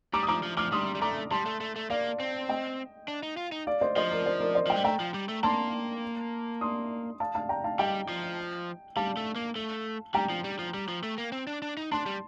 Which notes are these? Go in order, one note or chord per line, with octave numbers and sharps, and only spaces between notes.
G3 A#5 D6
D#6
F3 A#5 D6
F3
F3 D6 F6
G3 C6 D#6
G3
A3 A#5 D6
G3 A5 C6
A3
A3
A3
A#3 D5 F5
C4
D#5 G5
D4
D#4
F4
D#4
D5 F5
C5 D#5
F3 C5 D#5
A#4 D5
C5
A#4 D5
C5 D#5
F3 D#5 G5
G3
A3 G5 A#5
F3
G3
A3
A#3 A5 C6
C6 D#6
F5 A5
F5 A5
G5 A#5
F5 A5
G3 D#5 G5
F3
G3 F5 A5
A3
A#3
A3
G3 G5 A#5
F3
G3
F3
G3
F3
A3
A#3
C4
D4
D4
D#4
D4 A5 C6
G3